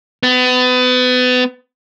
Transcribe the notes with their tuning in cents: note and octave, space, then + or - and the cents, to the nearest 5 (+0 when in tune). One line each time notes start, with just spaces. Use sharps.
B3 +30